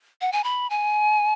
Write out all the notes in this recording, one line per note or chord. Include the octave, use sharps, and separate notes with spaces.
F#5
G#5
B5
G#5